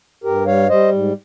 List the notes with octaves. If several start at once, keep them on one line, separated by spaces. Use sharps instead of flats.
G2 G4 A#4
G3 C#5 F5
G3 C5 D#5
G#2